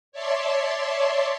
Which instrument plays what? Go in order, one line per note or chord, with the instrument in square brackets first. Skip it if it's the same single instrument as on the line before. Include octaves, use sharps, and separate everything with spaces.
[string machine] C#5 D5 E5 A5 C6